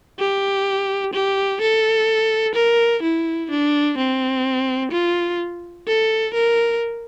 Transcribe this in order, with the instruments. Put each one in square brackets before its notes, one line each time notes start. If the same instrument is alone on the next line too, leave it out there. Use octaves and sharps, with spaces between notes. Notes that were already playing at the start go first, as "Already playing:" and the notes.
[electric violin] G4
G4
A4
A#4
E4
D4
C4
F4
A4
A#4